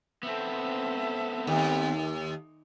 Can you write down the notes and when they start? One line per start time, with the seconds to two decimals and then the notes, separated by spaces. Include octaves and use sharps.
0.23 B3 C4 A4 E5
1.47 D#2